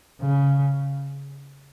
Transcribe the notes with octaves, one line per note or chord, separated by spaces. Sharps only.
C#3